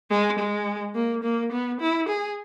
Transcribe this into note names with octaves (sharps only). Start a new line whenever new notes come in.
G#3
G#3
A#3
A#3
B3
E4
G#4